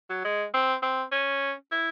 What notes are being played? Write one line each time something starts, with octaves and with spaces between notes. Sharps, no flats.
F#3
G#3
C4
C4
C#4
E4